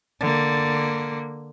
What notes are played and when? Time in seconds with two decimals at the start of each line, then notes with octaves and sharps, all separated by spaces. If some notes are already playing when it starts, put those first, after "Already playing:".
0.20 D3 A#3